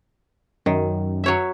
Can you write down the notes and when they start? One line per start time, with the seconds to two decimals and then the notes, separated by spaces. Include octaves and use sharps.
0.66 F#2 D#3
1.24 F#3 C#5 E5